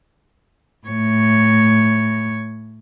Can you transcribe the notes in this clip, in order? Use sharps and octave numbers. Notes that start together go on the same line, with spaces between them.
A2 C#5